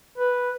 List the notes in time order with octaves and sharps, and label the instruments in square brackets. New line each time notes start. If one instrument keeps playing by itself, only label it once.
[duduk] B4